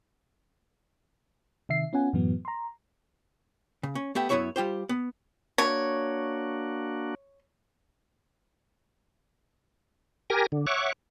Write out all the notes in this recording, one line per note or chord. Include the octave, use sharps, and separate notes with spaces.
C3 D#3 E5 C7
B3 C#4 F4 F#5 G#5
F#2 A2 E3 F#3 B3
A#5 C6
C#3
C#4
A3 B3 G4 E5
F#2 B2 B3 E4 C#5 E5
G3 F4 G4 C5
B3
A#3 D4 F#4 C#5
G4 A#4 G#5 A#6
D3
C#5 E5 F#5 C#6 D6